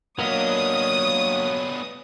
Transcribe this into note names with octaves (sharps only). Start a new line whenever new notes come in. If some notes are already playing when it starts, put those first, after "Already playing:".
F#3 A#3 B3 D4 C#5 D#5 D#6